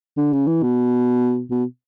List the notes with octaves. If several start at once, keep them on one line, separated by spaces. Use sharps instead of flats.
D3
C#3
E3
B2
B2